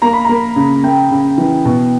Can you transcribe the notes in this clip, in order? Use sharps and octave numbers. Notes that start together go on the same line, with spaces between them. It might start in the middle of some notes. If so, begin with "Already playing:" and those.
A#3 A#5
B5
A#3 A#5
C#3
A#3 G5
C#3
E3
B2